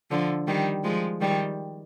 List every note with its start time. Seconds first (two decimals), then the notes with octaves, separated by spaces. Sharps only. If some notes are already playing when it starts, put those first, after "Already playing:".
0.11 D3 F3
0.47 D#3 G3
0.84 F3 G#3
1.21 D#3 G3